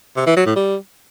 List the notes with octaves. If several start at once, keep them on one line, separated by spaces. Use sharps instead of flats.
C3
E3
F#3
A2
G3